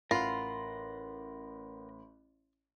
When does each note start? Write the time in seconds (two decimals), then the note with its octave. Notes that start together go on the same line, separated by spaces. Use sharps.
0.11 A1 F4 A#4 F#5 B5 C6